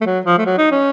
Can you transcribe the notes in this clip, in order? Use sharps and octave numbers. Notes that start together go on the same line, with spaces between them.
A3
F#3
F3
A3
F#3
D#4
C#4